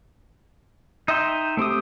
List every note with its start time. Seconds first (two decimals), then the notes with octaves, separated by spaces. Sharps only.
1.08 D#4 D#5 E5 G5 C6
1.57 A3 C4 G4 D#6